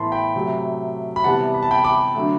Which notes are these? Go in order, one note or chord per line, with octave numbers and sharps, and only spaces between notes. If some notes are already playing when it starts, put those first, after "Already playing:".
Already playing: A2 E3 B3 A5 B5 C6
G5 B5
C3 F#3 A3
B5
C3 E3 G3 B3 F#5 A5
B5
A5
G5 B5
B5 D6
D3 F#3 A3